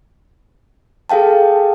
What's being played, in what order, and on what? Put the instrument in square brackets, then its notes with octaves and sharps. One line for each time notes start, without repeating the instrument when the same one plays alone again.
[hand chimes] G#4 A4 F5 G5 A5